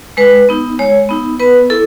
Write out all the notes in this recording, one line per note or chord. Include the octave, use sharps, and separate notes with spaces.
G#3 B4
B3 D#4
G#3 C#5
B3 D#4
B3 B4
E4 A4